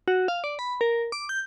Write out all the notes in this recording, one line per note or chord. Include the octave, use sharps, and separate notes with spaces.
F#4
F5
D5
B5
A#4
D6
G6